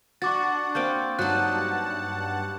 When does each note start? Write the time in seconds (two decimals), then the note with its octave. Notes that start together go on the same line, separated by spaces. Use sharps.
0.22 D4 F#4 F#5 C#6 D6 A6
0.75 A#3 C4 D6 G6
1.19 G2 F#3 D#4 F#5 A5 F#6